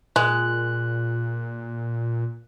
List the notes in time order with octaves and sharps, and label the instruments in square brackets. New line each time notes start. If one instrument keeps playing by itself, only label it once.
[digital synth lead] A#2 [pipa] G#3 [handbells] F#6